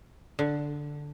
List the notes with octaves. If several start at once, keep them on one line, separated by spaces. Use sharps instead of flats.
D3